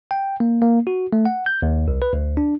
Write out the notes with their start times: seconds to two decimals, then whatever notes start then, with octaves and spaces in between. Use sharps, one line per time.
0.11 G5
0.40 A#3
0.62 A#3
0.87 F#4
1.13 A3
1.25 F#5
1.46 G6
1.62 D#2
1.88 C2
2.02 B4
2.13 D2
2.37 D4